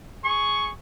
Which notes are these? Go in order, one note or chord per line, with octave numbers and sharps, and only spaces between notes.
G#4 C#6